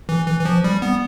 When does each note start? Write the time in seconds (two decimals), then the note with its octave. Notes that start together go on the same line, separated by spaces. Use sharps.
0.09 E3
0.27 E3
0.40 E3
0.45 F3
0.64 G3
0.82 B3